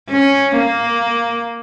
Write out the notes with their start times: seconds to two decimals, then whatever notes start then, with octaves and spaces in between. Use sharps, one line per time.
0.10 C#4
0.58 A#3